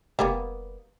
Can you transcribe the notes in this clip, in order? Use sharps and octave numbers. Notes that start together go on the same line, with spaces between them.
F1 G3 A#3 B3